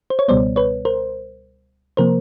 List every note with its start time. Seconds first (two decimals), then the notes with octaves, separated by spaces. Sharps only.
0.10 C5
0.19 C#5
0.28 C#2 B2 G3 B3 C5 D5
0.56 B4 C#5
0.85 A#4 C5
1.97 C3 F3 A#3 A#4 C5